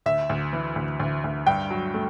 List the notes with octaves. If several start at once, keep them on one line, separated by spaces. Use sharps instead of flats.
D2 E5
D2
E3
D2
D2
D2
G2 G5
F#3
A3